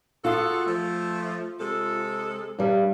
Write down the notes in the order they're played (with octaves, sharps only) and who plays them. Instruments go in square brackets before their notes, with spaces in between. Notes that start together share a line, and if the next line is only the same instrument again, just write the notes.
[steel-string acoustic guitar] F4 [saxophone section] F#4 G#4 A4
[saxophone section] F3 A3
C3 G#3 A4
[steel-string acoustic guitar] G2 G3